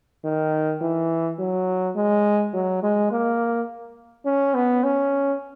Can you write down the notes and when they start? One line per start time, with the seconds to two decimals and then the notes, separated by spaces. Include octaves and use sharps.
0.24 D#3
0.81 E3
1.39 F#3
1.96 G#3
2.53 F#3
2.83 G#3
3.11 A#3
4.26 C#4
4.55 B3
4.83 C#4